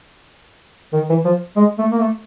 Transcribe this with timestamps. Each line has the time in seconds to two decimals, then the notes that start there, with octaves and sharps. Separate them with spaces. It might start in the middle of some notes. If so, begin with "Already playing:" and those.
0.93 D#3
1.10 E3
1.25 F3
1.56 G#3
1.79 A3
1.92 A#3
1.99 A3